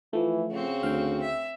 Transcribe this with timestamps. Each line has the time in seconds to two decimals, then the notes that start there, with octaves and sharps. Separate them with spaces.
0.13 E3 F3 A3
0.51 C#3 C4 F#4
0.83 D2 F5 G5
1.21 E5